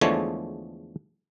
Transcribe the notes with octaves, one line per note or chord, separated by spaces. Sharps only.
E2 D3 F3 G#3 A3 C#5